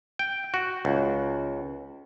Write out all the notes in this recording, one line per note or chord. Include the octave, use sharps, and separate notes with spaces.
G5
F#4
C#2